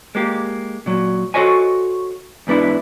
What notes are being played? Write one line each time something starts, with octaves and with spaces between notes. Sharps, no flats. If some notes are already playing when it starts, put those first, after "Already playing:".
G#3 A#3 G4
A#2 F#3
F#4 A4 C5 C#5 D#5 G#5
E2 G#2 B3 D4 E4